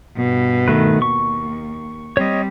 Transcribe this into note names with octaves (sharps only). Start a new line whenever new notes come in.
G2 B2
D#3 A3 B4
D#2 C#6
G3 C4 C#5 D#5